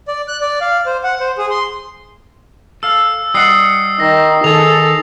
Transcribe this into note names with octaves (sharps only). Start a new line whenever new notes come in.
D5
F#6
D5
F5
C5
F#5
C5
G#4
C6
A4 F5 E6
G3 D#5 F#5 D#6 C7
D#3 A#6
D#3 G#4 A4 D#6 F7